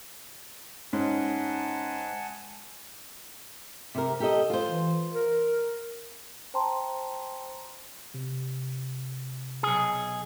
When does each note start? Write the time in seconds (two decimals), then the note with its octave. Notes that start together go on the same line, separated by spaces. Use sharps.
0.93 G#2 C#4 F#5 G#5 A5
3.95 C3 A#4
4.20 G4 A4 D#5
4.50 F4 C5
4.67 E3
5.13 A#4
6.54 C5 G5 A5 A#5 C6
8.14 C3
9.63 B1 G#4